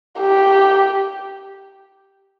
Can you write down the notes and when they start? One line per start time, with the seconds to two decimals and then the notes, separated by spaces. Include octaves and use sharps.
0.19 G4